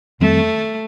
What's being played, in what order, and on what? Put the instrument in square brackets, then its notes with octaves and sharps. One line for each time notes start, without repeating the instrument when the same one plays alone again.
[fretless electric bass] F2 D#3 G3 C4 [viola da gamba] A3